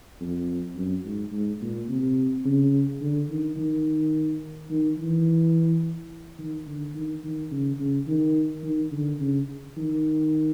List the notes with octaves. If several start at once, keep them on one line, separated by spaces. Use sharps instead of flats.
F2
F#2
G#2
G#2
A#2
C3
C#3
D3
D#3
D#3
D#3
E3
D#3
D3
D#3
D#3
C#3
C#3
D#3
D#3
D3
C#3
D#3